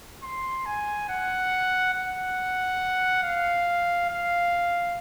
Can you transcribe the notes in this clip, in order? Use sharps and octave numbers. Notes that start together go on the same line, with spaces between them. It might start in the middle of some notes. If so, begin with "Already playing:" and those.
C6
G#5
F#5
F#5
F5
F5